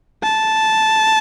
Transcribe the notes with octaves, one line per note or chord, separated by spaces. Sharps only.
A5